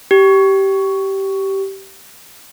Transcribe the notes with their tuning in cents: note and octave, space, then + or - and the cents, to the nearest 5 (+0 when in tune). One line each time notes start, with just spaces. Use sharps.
G4 -15